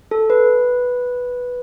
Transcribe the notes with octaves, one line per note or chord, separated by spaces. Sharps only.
A4
B4